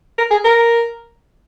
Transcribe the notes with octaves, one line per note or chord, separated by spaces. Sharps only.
A#4
G#4
A#4